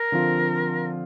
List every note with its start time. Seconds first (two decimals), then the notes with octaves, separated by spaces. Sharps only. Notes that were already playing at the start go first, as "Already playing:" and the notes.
Already playing: A#4
0.12 D3 F3 C4 F4